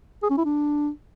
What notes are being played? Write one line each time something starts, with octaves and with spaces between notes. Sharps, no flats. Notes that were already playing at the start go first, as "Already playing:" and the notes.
G#4
C#4
E4
D4